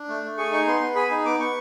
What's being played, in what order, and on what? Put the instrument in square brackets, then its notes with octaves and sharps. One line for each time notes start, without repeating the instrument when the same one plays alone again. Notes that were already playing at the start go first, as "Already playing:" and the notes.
Already playing: [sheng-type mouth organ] D4
A3
A3
G#4 C#6
D#4 C#6
B3 C6
B3
G#4 B5
D#4
B3 D6
B3 C#6